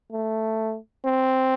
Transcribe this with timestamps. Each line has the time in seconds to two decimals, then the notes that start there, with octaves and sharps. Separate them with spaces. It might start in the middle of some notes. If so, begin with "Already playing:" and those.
0.12 A3
1.06 C4